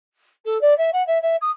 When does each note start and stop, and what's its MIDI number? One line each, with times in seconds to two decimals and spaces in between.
0.45 0.60 69
0.61 0.76 74
0.77 0.90 76
0.92 1.05 78
1.07 1.20 76
1.22 1.36 76
1.41 1.51 87